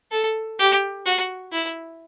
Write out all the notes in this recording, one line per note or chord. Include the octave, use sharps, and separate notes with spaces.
A4
G4
F#4
E4